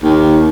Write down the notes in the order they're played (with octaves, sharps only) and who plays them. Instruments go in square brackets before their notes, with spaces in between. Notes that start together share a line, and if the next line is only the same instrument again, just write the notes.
[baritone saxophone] D#2